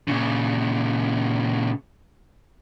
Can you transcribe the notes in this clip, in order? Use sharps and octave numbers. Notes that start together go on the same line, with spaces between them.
A#2 C#3